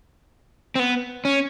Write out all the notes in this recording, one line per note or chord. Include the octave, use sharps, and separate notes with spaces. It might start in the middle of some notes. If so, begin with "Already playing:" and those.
C4
B3
C#4